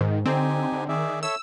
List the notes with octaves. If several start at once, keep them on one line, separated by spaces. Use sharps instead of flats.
G#2 D#3
D3 C4 D#4 G4 G#5
D3
D#3 G#4 D5 E5
A4 C#5 E5 E6